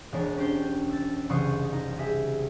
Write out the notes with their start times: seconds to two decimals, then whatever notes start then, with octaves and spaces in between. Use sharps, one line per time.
0.12 E1 G#3 D4 C#5 D7
0.37 C#4 D4 G4 C5 G5
0.89 E6 A6
1.30 F#1 C2 E3 C5 C#6 D#6
1.72 D#4
1.98 G4 G#4 E5